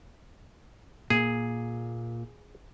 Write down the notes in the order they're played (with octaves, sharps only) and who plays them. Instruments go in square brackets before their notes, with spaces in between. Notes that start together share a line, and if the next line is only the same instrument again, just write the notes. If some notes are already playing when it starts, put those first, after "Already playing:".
[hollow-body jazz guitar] A#2 [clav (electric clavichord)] G#4